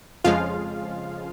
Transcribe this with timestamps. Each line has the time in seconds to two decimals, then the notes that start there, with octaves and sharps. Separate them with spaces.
0.24 F2 C#3 F3 G#3 F4 F5